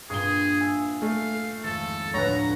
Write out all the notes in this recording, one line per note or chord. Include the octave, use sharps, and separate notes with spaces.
G2 A#2 G#4 D#6 G7
E5 G#5 E6
A3 F5
G#1 F2 A4
D2 A2 B4 C#5 A#5